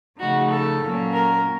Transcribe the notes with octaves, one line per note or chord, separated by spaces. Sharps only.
C#3 F3 A3 D#4 F#4
A4
A#2 F#3 A#3 C#4
A#4